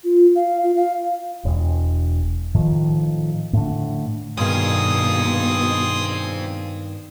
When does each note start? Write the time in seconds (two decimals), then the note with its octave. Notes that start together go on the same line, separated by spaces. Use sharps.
0.04 F4
0.35 F5
0.63 F4
0.76 F5
1.45 E1
2.54 A2 D#3 F3
3.53 A2 D3
4.37 G2 B2 D#3 C4 F4 G#4 D#6